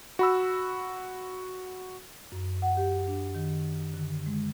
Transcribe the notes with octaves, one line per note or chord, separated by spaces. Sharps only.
F#4 B5 E6
F#2
F#5
G4
D4
D#3
D3
G#3